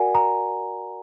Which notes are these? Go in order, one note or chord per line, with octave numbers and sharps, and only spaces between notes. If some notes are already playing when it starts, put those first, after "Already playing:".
Already playing: F#4 A#4 D5 F#5 G#5
A#5